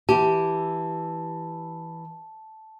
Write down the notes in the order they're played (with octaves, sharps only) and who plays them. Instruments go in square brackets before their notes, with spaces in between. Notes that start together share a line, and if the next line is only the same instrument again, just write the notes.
[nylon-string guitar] E3 E4 G4 [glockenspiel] A5